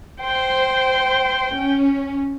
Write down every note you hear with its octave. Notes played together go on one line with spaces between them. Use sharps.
C5 G5
C#4